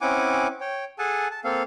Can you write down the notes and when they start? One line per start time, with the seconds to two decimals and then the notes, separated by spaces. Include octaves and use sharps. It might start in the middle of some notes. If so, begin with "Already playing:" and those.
0.01 C4 C#4 E4 F#5 G#5 D6
0.61 C#5 G5
0.99 G#4 A4 F#5 G#5 A5
1.31 A5
1.44 A#3 C4 A4 F5